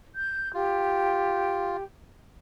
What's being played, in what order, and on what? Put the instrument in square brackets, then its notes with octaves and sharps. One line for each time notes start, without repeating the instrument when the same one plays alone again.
[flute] G6
[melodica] F4 [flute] G4